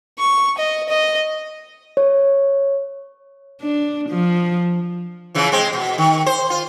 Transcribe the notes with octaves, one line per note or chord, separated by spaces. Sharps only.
C#6
D#5
D#5
C#5
D4
F3
C#3 E3 F3
G#3 C4
B2
D#3
C5
F4